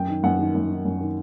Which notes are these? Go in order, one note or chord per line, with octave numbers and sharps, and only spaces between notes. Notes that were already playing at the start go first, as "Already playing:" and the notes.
Already playing: F#2 G5
D#3
F#2 F#5
D#3
F#2
D#3
F#2
D#3